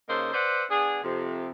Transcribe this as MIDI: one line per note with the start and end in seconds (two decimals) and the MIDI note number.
0.08 0.29 49
0.08 0.29 58
0.08 0.29 63
0.08 0.29 69
0.08 0.29 72
0.34 0.64 71
0.34 0.64 72
0.34 0.64 74
0.34 0.64 76
0.34 0.64 78
0.71 0.99 59
0.71 0.99 62
0.71 0.99 68
1.03 1.49 41
1.03 1.49 48